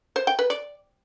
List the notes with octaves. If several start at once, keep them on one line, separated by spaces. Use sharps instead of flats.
C5
G5
B4
D5